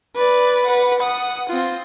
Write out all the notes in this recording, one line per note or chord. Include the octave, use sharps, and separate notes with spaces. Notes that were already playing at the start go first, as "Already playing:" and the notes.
B4 D5
B4 F#5
F#5 D#6
C4 F4